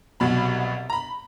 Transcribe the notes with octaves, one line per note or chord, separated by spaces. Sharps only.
C2 B2 F#3 B5
A#5
B5